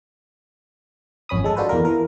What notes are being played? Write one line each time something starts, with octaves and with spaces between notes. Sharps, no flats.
G#1 F2 C#4 B5 D#6
G#3 A4
D4 F4 F#4 A4 B4 C5
E2 A#3 A#4
E3 A#4